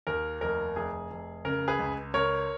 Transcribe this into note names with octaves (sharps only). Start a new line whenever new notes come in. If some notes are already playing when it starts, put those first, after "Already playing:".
D#2 A#4
F1 A#4
F1 G#4
F1
C#3 A#4
G#4 B4
C#2
C#2 A#4 C#5